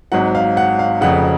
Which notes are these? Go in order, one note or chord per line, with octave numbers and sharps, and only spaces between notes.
G#1 G#2 F#3 F#5
F5
F#5
F5
F1 F2 C#3 F#5